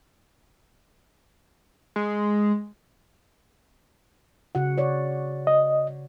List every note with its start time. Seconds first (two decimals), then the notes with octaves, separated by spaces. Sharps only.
1.96 G#3
4.55 C#3 F#4 F#5
4.78 C#3 C#5 D5
5.47 D#5